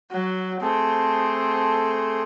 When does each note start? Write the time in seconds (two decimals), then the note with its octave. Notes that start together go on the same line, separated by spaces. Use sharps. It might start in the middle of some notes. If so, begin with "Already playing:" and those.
0.12 F#3
0.61 A3 C4 G#4 A4